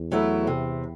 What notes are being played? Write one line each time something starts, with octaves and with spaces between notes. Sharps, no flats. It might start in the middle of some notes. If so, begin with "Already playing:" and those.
Already playing: E2
F#3 A3 E4
C3